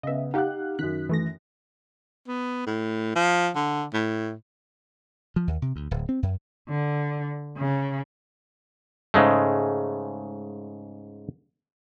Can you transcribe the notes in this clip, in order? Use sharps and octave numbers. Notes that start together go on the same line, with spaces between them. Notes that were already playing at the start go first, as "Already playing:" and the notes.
C#3 B3 D#5 E5
D#4 G4 F5 F#5 F#6
F#2 D#3 F#6 B6
E3 A3 A#6
B3
A2
F3
D3
A2
F3
D#2
C3
D2
D1
C4
F#2
D3
C#3
G#2 C#3 G#3 A3